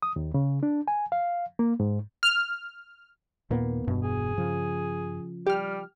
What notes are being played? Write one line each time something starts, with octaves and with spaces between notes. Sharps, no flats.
D#6
D#2
C#3
D4
G#5
F5
A#3
G#2
F6
D#2 A#2 A#3 B3
E1 G2 B2
G#4
C#3 F3
G3 G4 F6